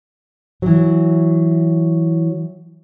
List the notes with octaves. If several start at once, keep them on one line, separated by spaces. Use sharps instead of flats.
E3 F#3